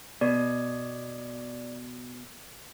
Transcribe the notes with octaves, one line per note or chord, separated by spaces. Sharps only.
B2 D5